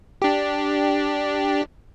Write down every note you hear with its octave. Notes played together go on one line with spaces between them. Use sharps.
D4 G4